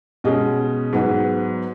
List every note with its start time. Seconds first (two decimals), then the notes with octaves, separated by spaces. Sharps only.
0.24 B2 G#3 C#4 D#5
0.93 G#2 F#3 B3